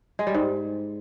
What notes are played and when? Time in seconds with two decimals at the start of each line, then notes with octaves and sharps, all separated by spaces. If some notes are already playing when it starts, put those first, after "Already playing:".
0.19 G#3
0.27 G3
0.34 G#2